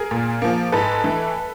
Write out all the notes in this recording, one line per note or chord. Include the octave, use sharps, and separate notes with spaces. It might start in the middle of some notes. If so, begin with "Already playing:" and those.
Already playing: G#4 A#4
A#2
F3 A#3
G#2 A4 B4
E3 A3